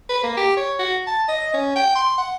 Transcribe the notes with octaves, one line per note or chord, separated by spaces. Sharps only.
B4
A#3
G4
C#5
F#4
A5
D#5
C#4
G5
C6
F#5